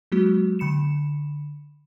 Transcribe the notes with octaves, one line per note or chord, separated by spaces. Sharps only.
F#3 G#3 A#3 F#4
D3 B5 C#7 E7